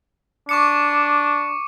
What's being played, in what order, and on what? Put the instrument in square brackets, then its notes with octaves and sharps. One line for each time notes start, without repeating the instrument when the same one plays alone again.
[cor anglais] D4 [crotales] C#6 D6 C#7